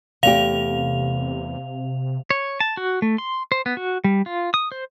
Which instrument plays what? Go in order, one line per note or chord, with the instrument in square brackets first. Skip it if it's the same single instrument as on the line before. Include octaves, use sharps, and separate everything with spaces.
[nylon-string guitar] E2 A3 G4 [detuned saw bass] C3 [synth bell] F5 F7
[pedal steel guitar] C#5
A5
F#4
A3
C6
C5
B3
F#4
G3
F4
D#6
C5